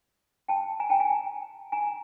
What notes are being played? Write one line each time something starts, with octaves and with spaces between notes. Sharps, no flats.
G5 A5
G#5 A#5
G5 A5
G#5 A#5
G#5 A#5